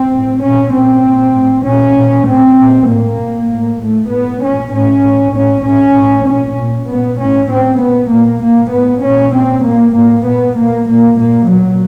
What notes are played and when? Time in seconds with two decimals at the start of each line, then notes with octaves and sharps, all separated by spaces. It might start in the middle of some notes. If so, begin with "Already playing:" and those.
Already playing: C4
0.10 A2
0.41 A#2 C#4
0.72 A#2 C4
1.02 A#2
1.33 A2
1.63 A#2 C#4
1.94 A#2
2.25 A2 C4
2.56 A#2
2.86 A2 A#3
3.18 A#2
3.49 A2
3.79 A2 A3
4.10 A2 B3
4.41 A#2 C#4
4.71 A2 C#4
5.02 A2
5.33 A2 C#4
5.63 A2 C#4
5.95 A2
6.25 A#2 C#4
6.56 A#2
6.87 A#2 B3
7.18 A2 C#4
7.48 A2 C4
7.79 A#2 B3
8.10 A#2 A#3
8.41 A#2 A#3
8.71 A2 B3
9.02 A#2 C#4
9.33 A#2 C4
9.63 A#2 A#3
9.94 A2 A#3
10.25 A#2 B3
10.56 A#2 A#3
10.87 A#2 A#3
11.17 A#2 A#3
11.48 A#2 F#3